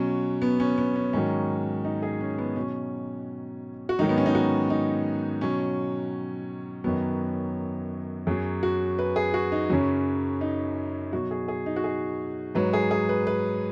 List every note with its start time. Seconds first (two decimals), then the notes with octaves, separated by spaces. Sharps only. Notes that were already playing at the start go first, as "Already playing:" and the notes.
Already playing: B2 F#3 C#4
0.42 B3
0.60 C#4
0.78 B3
0.96 C#4
1.13 G#2 D#3 F#3 C#4
1.85 D#4
2.02 G#4
2.21 C#4
2.38 B3
2.56 B2 F#3 C#4
3.89 F#4
3.99 G#2 D#3 F#3 D#4
4.09 B3
4.18 C#4
4.26 D#4
4.35 F#4
4.70 D#4
5.41 B2 F#3 C#4
6.84 F#2 D#3 F#3 B3
8.27 F#2 F#3 G#4
8.63 F#4
8.99 B4
9.16 G#4
9.34 F#4
9.52 D#4
9.70 F#2 C#3 F#3 C#4
10.41 D#4
11.13 B2 F#3 F#4
11.31 G#4
11.48 G#4
11.66 D#4
11.76 F#4
11.84 G#4
12.55 G#2 F#3 B4
12.73 G#4
12.91 G#4
13.09 B4
13.27 B4